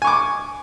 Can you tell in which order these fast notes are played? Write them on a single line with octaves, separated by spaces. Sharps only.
G#5 C#6 D6